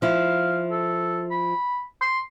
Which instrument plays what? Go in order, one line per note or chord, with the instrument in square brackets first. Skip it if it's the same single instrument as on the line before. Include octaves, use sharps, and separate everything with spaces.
[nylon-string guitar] F3 E4 [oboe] F5
[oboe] A4
B5
C6